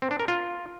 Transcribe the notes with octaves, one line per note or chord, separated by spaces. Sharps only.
C4
D4
A#4
F4